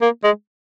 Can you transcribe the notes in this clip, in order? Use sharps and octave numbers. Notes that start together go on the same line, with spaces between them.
A#3
G#3